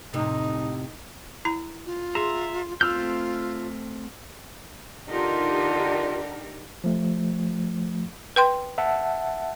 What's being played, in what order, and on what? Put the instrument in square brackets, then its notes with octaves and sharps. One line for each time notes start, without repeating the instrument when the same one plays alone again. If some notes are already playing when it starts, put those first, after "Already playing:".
[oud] F2 A2 C3 [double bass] D#4
[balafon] E4 A#5
[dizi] F4
[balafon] G#4 [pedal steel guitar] E5 A#5 [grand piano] C6
[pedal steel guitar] A3 C4 G6 [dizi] F4 [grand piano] E6 F6
[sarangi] D3 [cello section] D#4 G4 A#4 [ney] F4
[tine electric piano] F3 A3
[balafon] B4 G5 C6
[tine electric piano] E5 F#5 A5